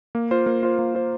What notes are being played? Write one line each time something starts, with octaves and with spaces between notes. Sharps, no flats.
A#3
F4 C5
A#3
F4 C5
A#3
F4 C5